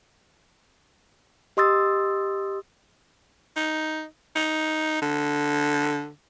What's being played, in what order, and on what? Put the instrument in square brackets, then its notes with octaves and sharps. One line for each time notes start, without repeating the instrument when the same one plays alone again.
[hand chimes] G4 D#5 C6 D#6 E6 A6
[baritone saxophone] D#4
D#4
D3